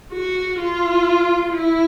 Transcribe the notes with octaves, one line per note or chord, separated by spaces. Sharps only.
F#4
F4
E4